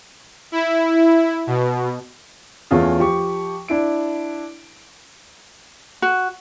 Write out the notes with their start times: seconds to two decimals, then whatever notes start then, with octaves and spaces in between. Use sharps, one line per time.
0.52 E4
1.47 B2
2.71 E2 A3 C#4 F4 G#4
2.99 F3 G4 C#6
3.68 D4 E4 D7
6.02 F#4